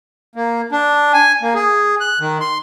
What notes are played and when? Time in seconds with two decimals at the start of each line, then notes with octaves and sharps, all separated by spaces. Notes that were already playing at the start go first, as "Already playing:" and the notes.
0.36 A#3
0.72 D4
1.14 G#5
1.42 A#3
1.55 G#4
2.00 F#6
2.20 D#3
2.40 C6